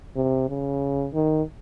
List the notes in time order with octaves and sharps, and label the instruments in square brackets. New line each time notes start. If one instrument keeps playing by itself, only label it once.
[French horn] C3
C#3
D#3